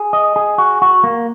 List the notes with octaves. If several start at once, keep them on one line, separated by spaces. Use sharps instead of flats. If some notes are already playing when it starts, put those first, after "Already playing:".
Already playing: G#4
D#5
G#4
F#4
F#4
A#3